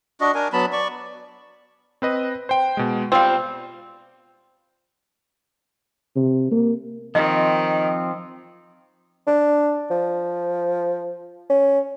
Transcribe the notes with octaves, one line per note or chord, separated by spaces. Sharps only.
D4 F#4 D#5
D4 A#4 G#5
F#3 B3 A5 B5
D5 C#6
C4 B4 D#5
C5 G5
B2 G#3
G3 C4 F4 C5 F5
C3
A#3
D#3 F3 C4 D#5
D4
F3
C#4